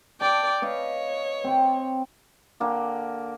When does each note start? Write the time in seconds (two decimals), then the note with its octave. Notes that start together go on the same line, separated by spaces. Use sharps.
0.21 D5 G5 A5
0.62 B4 C#5 D#5 F5
1.44 C4 G5
2.60 D3 A#3 G4